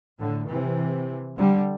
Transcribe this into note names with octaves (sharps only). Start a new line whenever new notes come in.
A2 D3
C3 E3
D3 G3